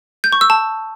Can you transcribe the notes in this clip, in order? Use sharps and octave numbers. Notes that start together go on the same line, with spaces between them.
G6
C#6
E6
A5